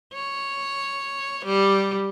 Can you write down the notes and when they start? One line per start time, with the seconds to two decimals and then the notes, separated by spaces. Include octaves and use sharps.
0.13 C#5
1.45 G3